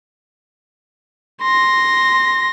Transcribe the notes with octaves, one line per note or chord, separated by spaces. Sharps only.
C6 A#6